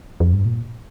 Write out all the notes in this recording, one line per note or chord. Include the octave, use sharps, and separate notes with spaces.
F2
G2
A#2